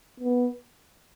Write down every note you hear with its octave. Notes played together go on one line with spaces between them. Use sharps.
B3